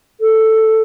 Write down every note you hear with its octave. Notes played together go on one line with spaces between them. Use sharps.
A4